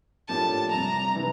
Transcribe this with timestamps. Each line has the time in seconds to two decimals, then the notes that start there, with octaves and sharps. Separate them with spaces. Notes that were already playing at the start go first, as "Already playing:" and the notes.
0.29 A2 F3 A#3 D4 G4 A5
0.71 C2 C3 G3 A#5
1.15 C3 E3 G3 D4